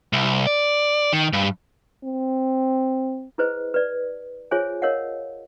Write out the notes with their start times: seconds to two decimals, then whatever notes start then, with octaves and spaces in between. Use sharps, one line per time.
0.13 C2
0.47 D5
1.13 D#3
1.33 G2
2.04 C4
3.38 E4 G#4 B4 C5 D#5
3.74 B4 D5
4.51 F4 G#4 C5 C#5 E5 G#5
4.82 A#4 C#5 D#5 F5 F#5